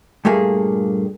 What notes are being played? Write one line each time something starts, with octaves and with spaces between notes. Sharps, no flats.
G2 A#2 A3 A#3 G#4